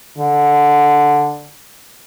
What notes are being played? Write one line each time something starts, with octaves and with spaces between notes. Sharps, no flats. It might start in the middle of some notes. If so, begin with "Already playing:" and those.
D3